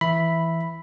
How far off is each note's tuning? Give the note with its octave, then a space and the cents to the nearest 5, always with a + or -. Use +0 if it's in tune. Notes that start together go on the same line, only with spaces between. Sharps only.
E3 +0 E5 +0 B5 +0